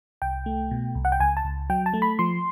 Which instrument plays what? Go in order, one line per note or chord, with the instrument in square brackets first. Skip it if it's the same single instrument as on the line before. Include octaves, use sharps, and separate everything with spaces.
[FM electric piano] C2 G5
A3
B2
C2
F#5
G5
C#2 G#5
A5
C#2
F#3 G5
A5
A3
B5
F3 C6